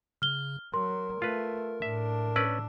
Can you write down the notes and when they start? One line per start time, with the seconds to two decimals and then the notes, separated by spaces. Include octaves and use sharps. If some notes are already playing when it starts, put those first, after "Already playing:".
0.22 C#3 F6 G7
0.74 F#3 A#4 C6
1.22 A3 F4 B4
1.82 A2 D4 E5
2.36 C#4 B4 D5 E6